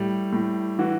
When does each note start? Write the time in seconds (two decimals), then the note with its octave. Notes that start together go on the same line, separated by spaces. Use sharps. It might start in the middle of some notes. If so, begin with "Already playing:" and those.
Already playing: A2 G3
0.32 A2
0.79 E3 F#4